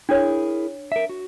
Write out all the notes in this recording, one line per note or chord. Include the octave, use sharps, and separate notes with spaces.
D4 E4 G#4 A#4 C#5
A#4 E5
F#4